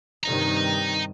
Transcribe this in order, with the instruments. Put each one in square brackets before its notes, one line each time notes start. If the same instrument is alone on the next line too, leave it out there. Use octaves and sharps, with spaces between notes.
[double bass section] G2 C3 D#3 [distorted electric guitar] D#5 A#5